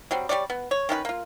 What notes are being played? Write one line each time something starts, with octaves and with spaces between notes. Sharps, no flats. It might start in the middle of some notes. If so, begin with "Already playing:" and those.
F#3 G3 C4
G3 B3 C#5 D5
B3
C#5
D#3 C#4 F4 B4
A#3 F4